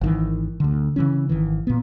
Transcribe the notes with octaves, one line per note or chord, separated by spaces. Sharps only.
G#1 D#3 E3
D2 D3
C#3 E3 C#4
G#1 D2 D#3 E3
A#2 B3